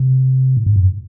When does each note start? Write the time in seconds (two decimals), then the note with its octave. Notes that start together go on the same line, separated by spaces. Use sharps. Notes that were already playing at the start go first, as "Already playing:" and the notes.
Already playing: C3
0.57 A2
0.66 G#2
0.76 F#2